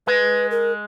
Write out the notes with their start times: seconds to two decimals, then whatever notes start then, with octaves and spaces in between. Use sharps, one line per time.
0.07 G#3 B4
0.51 A#4